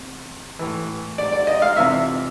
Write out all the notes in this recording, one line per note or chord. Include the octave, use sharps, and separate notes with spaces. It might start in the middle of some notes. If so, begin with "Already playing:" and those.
Already playing: E2 C3
A2 E3
D5
D5
D#5
F5
F2 C3 E3 E5